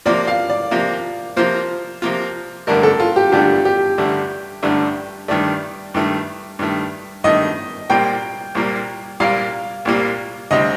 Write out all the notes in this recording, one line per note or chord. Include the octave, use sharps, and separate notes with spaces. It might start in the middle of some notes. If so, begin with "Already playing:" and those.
C3 F3 A#3 F4 D5
F5
D5
C3 F3 A#3 F4
C3 F3 A#3 F4 C5
C3 F3 A#3 F4
A1 G2 D3 A3 D4 A#4
A4
F4
G4
A1 G2 D3 A3 D4 G4
G4
A1 G2 D3 A3 D4
A1 G2 D3 A3 D4
G2 D#3 A3 D5
G2 D#3 A3
G2 D#3 A3
G2 D#3 A3 D#5
C2 A#2 G3 A#3 G5
C2 A#2 G3 A#3
C2 A#2 G3 A#3 F5
C2 A#2 G3 A#3
D2 C3 G3 C4 D#5